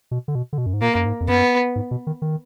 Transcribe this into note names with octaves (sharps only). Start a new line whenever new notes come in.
B2
D3
B2
D3
B2
F#2
G#2
A#2 A#3
F#2
G#2
F2
F#2 B3
G#2
B2
D#3
D#3